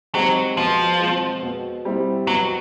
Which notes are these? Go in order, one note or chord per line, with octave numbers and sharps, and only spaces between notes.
F#3 G#3 C4 D#4 G4
B2 F3
G#3 C4
B2
G3 C4 E4
B2 F#3